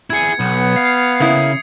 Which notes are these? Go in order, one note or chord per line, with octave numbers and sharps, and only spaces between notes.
E4 G#4 G#6 C#7
B1 B3
F5 C7
C#3 A#3 E4 D#6